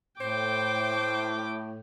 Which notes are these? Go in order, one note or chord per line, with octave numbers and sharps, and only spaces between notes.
A2 C5 G5 D6